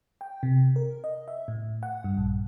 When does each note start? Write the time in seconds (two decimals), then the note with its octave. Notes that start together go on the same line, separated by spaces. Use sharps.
0.21 G5
0.43 C3
0.76 A#4
1.04 D#5
1.28 E5
1.48 A2
1.83 F#5
2.04 G2
2.17 A#1